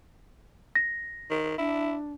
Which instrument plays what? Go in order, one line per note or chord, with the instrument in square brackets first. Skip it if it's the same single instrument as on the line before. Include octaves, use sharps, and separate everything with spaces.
[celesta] A#6
[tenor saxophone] D#3
[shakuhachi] D4 [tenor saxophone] E4